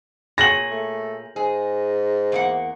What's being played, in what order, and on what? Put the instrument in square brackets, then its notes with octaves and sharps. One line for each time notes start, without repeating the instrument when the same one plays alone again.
[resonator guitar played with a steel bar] A#2 G#4 C#5 [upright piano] A#6 F#7
[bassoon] A3
[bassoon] G#2 [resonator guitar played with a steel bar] G#4
[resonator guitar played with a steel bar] E2 A#3 F#5